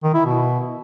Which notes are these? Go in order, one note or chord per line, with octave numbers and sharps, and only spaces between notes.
D#3
E4
B2